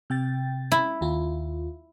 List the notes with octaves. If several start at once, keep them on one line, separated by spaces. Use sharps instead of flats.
C3 G5 A6
E4
D#2 F4